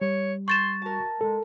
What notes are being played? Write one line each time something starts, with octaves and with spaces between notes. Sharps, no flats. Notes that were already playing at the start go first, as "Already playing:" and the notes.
G3 C#5
C6 C#6 G6 A6 E7
F#4 A#4 A5
G#3 A4